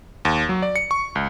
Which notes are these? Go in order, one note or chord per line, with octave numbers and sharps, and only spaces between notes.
D#2
F#3
D5
C#7
C#6
C#2